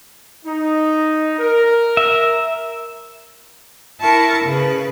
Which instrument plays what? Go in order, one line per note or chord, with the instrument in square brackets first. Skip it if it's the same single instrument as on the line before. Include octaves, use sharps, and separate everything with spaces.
[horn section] D#4
A#4
[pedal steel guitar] E5
[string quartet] E4 A#4 A5 C#6
C#3 B4